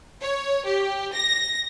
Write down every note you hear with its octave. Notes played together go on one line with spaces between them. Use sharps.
C#5
G4
A#6